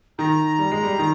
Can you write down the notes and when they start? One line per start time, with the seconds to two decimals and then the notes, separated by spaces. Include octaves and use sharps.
0.18 D#3 A#5
0.59 G3
0.71 G#3
0.83 G3
0.99 D#3